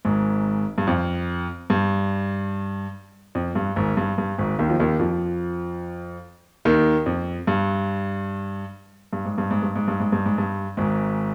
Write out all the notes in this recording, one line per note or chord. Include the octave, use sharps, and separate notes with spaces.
G#1 G#2
G2
F2
G2
F2
G2
G#1 G#2
G2
G2
G#1 G#2
D#2 D#3
F3
D#2 D#3
F2 F3
D#2 D#3
F2
G2
G2
G#2
G2
G#2
G2
G#2
G2
G#2
G2
G#2
G2
G#1 G#2